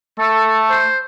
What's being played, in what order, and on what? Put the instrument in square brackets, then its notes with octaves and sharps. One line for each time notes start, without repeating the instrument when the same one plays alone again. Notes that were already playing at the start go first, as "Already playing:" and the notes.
[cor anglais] A3 [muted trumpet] A4
[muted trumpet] C5